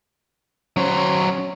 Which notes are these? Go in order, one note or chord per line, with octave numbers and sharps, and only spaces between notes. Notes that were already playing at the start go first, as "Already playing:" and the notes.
F#3 C#4 C5